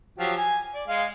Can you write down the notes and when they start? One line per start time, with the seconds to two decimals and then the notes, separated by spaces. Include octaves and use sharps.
0.19 F3 F#3 G4
0.37 G#5
0.75 D5
0.88 G#3 D#5 F5